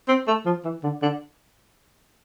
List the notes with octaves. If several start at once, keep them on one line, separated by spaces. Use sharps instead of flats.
C4
A3
F3
E3
D3
D3